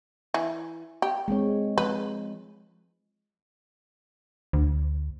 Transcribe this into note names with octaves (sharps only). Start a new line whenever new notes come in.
E3
G4
G#3 C4 C#5
F3 B4
D2